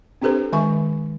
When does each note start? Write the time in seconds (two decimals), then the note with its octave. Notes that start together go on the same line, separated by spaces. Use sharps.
0.22 C4 D4 G4 A4 B4 C5
0.52 D#3 G#3 E5 G#5 C#6